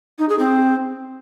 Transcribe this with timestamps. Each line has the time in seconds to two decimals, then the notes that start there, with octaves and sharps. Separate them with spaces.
0.19 D#4
0.29 G#4
0.39 C4